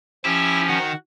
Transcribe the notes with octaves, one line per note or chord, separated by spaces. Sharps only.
F3 C#4 E4 G4
D#3 F#4